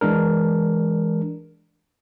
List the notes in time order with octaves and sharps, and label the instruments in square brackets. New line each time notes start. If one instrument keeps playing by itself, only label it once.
[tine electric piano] E3 G#3 D4 A#4